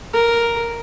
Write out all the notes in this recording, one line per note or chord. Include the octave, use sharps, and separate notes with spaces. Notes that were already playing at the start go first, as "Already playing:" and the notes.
A#4